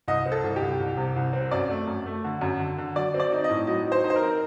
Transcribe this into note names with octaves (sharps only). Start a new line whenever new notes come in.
C2 D#5
C4
A4
C2
G4
C2
C2
C3
C2
C4
F#2 D5
A3
F#2
A3
D3
F#2
D3
D3
F#3 D5
C4
D5
D#4
D#5
A2
F#3 D#5
D#4
C5
D#4
C5
A#4
C4